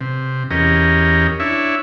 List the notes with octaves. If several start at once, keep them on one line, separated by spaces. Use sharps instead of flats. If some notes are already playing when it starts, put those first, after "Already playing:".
C3
E2 C#4 G4 A#4 D#5
D4 E4 C#5 E5